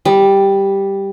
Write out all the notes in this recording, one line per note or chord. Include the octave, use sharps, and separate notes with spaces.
G3